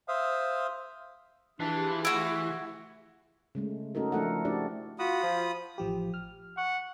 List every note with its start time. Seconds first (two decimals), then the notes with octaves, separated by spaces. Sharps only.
0.08 C5 E5 F5 D#6
1.60 E3 D4 F4 G4 G#4
2.05 A3 E4 F#4
3.55 C#3 G#3 A3
3.95 A3 C#4 D#4 F#4 A4 A#4
4.12 F3 A3 D4 A4 A#4 F#5
4.45 D4 E4 F#4 G4 D5
4.99 F4 F#4 B5 D#6
5.23 F3
5.78 A1 F3 G4
6.14 F6
6.57 F#5 C#6